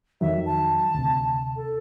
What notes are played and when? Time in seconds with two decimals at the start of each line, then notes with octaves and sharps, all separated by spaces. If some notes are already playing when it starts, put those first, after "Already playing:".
0.21 F2 D#3 F#3 E5
0.46 A5
0.94 D2 C3
1.56 A4